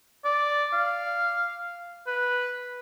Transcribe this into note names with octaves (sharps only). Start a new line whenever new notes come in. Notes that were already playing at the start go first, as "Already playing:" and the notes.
D5
F5
B4